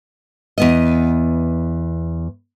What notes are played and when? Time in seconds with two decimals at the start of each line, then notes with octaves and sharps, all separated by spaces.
0.58 E2 B3 D#5